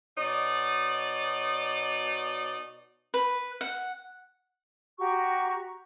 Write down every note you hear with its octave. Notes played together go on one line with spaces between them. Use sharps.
B2 D#4 C#5 D5
B4
F#5
F#4 G4 A#5 C#6